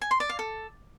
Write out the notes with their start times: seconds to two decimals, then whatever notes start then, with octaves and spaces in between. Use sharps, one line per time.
0.01 G#5
0.11 C6
0.20 D5
0.29 F5
0.39 A4